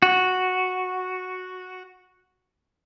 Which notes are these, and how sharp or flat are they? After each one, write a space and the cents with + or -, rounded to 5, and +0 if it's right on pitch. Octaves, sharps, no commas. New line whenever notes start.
F#4 -5